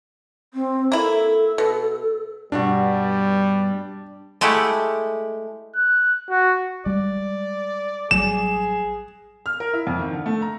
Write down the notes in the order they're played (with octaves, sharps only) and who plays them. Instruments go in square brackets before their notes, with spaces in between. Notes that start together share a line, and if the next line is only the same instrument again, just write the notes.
[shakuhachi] C4
[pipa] A#3 E4 [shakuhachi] A4
[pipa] B2
[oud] G2 B2 F#4 [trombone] G3 [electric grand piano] D4
[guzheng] G#3 A3 E4 G4 F#5 G5
[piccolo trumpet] F#6
F#4
[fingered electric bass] G3 G#3 [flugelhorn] D5
[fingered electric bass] A1 F#3 G3 [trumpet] G#4 [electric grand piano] E7
[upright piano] F6
A#4
E4
F2
D#3
D3
A3
A#5